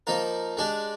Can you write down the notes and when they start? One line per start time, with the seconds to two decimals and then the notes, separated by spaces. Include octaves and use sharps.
0.07 F3 A#3 D#4 A#4
0.57 G#3 D4 G4